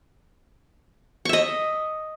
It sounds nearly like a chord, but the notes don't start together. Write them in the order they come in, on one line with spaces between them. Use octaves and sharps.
C#6 E5 D#5